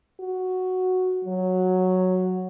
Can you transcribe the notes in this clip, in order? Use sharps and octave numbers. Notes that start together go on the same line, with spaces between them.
F#4
F#3